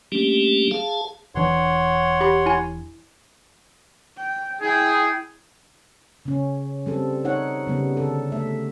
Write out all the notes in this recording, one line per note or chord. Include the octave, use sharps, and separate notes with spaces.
G3 A3 A#3 C#4 D4 G4
G#4 F5 A5
E1 E3 D4 C#5 F#5 C6
G4 B5
E4 G#5
G5
E4 G#4 G5
C#3 C#4
G3 C4 A4
D#4 C#5 F#5
C#3 G3 B3
D3 A4
A3 E5